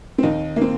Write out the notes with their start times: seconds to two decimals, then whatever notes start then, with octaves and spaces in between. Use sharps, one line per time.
0.18 C4
0.23 D#2 D#3 D#4
0.56 A#3
0.61 C4